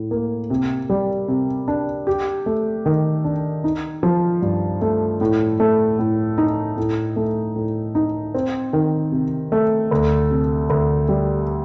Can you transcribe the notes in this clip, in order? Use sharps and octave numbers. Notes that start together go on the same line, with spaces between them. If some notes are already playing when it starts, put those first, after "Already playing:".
Already playing: A2
A#3
C3
G3
C3
D4
G4
A3
D#3
D4
D#4
F3
G2
A3
A2
A3
A2
D#4
A2
A3
A2
D#4
C4
D#3
C3
A3
D2
C3
D2
G3